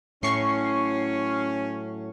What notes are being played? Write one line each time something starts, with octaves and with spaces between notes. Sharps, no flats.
A2 F#3 C#4 C#6 C7